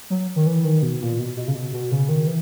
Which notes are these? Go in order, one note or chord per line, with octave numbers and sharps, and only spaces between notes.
F#3
D#3
E3
D#3
B2
A#2
B2
B2
C#3
B2
B2
C#3
D#3
E3